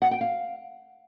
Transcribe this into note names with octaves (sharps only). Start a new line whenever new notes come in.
F#5
G5
F5